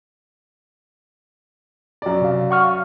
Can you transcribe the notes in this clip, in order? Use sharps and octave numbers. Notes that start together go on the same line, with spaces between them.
F#2 D5
C3 F5
F#5 C#6 F6
F5